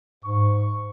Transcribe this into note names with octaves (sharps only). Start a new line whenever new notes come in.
G#2 C#6